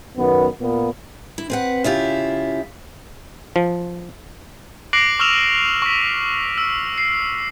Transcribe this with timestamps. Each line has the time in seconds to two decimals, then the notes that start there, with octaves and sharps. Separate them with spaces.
0.17 F#2 D#3 B3
0.60 A#2 B3
1.38 E4
1.50 C4 B4 F#5
1.84 C#3 E4 F4 G4
3.56 F3
4.93 D6 F#6 A#6 C7 D7 F#7
5.19 C#6 E6 F6 E7 F7
5.82 C#6 B6
6.58 E6
6.98 C7